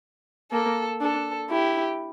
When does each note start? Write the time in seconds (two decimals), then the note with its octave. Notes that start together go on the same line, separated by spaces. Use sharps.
0.52 A#3 A4
1.00 D4 A4
1.50 E4 G4